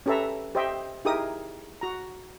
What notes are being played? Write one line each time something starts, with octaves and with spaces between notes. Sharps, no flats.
C#4 G4 A4 B4 E5 A#5
G4 C5 D#5 E5 G5
D#4 E4 G4 G#4 A#4 D#6
F#4 A#5